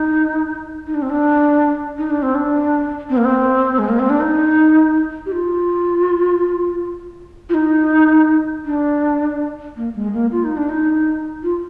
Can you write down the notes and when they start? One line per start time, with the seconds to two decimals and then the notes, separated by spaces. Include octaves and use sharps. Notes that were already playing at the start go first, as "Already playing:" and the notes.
Already playing: D#4
0.87 D#4
0.95 D4
1.02 C4
1.10 D4
1.98 D#4
2.10 D4
2.22 C4
2.35 D4
3.10 C4
3.17 A#3
3.25 C4
3.79 G#3
3.89 A#3
3.99 C4
4.10 D4
4.21 D#4
5.26 G4
5.32 F4
7.49 F4
7.54 D#4
8.65 D4
9.77 A#3
9.95 G#3
10.14 A#3
10.32 F4
10.44 D#4
10.57 D4
10.69 D#4
11.43 F4